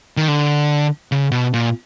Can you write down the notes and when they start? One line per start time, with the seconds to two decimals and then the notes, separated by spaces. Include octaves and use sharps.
0.17 D#3
0.28 D3
1.12 C#3
1.31 B2
1.53 A#2